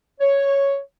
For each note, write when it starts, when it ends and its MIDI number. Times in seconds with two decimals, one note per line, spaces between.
0.21 0.78 73